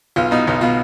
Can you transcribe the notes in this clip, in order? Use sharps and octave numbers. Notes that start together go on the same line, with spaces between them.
B1 F4
B2 D#4
B1 D#4
B2 F4